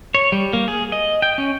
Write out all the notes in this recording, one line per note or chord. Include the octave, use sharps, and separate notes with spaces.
C#5
G3
A#3
G#4
D#5
G5
C#4